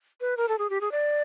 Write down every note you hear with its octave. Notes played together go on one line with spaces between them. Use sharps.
B4
A#4
A4
G#4
G4
G#4
D5